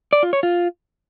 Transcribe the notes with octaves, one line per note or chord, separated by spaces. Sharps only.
D5
F4
C#5
F4